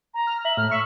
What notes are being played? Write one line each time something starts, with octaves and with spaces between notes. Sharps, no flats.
A#5
F6
E5 F#7
A2 F6
E5 C#6